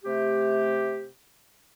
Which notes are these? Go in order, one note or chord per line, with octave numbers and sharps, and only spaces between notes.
C3 A3 G4